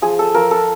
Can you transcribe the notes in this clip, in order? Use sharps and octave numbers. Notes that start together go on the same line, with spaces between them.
F3 G#4
A4
F3 A#4
A4